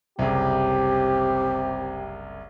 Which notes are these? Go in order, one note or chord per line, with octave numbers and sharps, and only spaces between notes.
F#1 C2 C3 G4